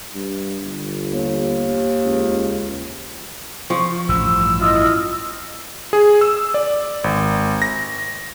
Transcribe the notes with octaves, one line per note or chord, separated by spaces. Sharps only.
G2
G1
D#2
C#2
F3 C#6
A1 G2 E6
E4 F4 D#5
G#4
E6
D5
G#1
A#6